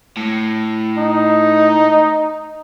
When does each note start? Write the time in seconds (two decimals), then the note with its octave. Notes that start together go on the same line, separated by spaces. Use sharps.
0.17 A2
0.98 D#4